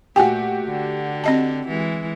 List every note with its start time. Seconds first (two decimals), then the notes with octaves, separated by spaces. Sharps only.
0.16 A#2 A3 F#4 G4 G5 G#5
0.66 D3
1.24 C4 D#5 A5
1.68 E3 G#3